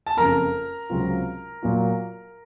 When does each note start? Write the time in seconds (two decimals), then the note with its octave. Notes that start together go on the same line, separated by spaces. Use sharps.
0.07 A5
0.17 F#1 F2 C#3 A#4 A#5
0.90 C#2 C3 F#3 C4 F4
1.62 A#2 F#3 A#3 F4